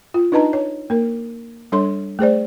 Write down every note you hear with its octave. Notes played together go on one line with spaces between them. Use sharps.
F4
D4 D#4 B4 D#5 A5 A#5
C#5
A#3 A#4
G3 D4 A4 C#5 C6
A3 G#4 C5 D5